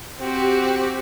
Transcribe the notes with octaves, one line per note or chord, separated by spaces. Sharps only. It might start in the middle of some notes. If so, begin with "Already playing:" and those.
C4 F#4 G4